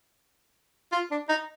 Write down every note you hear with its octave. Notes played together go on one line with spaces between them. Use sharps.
F4
D4
D#4